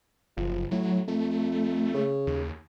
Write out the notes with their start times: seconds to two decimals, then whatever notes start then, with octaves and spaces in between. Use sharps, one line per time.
0.37 F#1 F3
0.71 A2 F#3
1.08 F2 A3
1.94 C#3
2.27 D#2